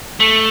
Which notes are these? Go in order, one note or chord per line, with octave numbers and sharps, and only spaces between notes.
A3